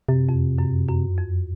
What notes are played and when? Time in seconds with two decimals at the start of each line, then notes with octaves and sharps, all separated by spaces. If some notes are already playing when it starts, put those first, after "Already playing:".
0.09 F#2 C3
0.29 F2
0.58 F#2
0.88 F#2
1.18 F2